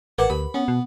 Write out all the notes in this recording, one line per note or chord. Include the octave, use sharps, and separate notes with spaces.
A1 A#4 B4 F#5 A5 D6
D2 G4 B5
B3 C#4
B2